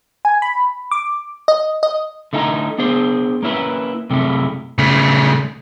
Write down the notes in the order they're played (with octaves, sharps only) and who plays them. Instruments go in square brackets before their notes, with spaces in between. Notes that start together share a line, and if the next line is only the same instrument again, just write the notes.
[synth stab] G#5
B5
D6
D#5
D#5
[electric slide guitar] D3 A3 D#4 E4 G#5 A#5
B3 D4 G#4 C5
A#3 C#4 E4 B4
F#2 C3 G#3 A3 E4
[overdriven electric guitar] C#3 A3